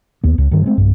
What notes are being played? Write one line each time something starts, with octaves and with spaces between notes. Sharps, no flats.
D#2 B3
C#2
G2 D#3
G#3 A3 C4
B1 G2